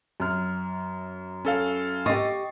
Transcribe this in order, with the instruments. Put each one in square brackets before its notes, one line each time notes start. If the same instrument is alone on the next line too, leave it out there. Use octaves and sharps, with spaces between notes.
[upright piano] F#2 F6
[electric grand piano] C#4 A4 F5
[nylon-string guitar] G4 D#5 [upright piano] C#6 A6 C7